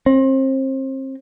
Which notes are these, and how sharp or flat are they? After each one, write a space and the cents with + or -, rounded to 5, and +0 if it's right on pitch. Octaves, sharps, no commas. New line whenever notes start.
C4 +30